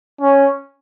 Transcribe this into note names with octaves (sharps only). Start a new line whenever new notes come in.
C#4